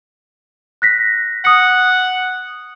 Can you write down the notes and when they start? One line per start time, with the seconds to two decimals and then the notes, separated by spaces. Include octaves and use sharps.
0.82 F#6 A#6 B6
1.45 F#5 D#6 C#7